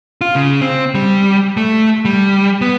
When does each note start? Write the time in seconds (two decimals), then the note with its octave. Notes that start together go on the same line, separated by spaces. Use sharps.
0.21 F4
0.35 C#3
0.61 C4
0.95 G3
1.57 A3
2.05 G3
2.61 B3